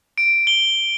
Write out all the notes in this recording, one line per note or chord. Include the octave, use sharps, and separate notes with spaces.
D7
G7